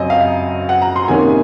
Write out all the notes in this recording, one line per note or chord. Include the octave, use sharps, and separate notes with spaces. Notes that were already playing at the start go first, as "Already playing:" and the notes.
Already playing: F#2 C#3 F#3 C4 C#5 D#5
F5
F#5
A#5
C6
C3 D#3 A#3 C#4 G#5